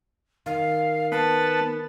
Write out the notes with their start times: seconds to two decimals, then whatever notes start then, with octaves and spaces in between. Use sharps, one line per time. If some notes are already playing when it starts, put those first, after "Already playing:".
0.46 D#3 F5
1.12 B3 A5